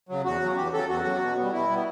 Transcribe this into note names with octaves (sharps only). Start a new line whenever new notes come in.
C#3 F#3
E2 F#4
C#3 F#3
E2 G4
C#3 F#3 A4
E2 F#4
C#3 F#3
B2
G3 B3
B2 E4
G3 B3